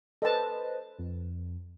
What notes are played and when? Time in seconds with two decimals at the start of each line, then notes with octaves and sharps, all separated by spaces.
0.22 A4 B4 C5 D#5 A5
0.99 F2